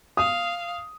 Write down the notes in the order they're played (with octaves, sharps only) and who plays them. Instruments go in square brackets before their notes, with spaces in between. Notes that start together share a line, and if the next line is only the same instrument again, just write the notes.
[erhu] F5 [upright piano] D#6